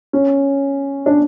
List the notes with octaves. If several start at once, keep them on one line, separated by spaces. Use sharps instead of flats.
C#4
D4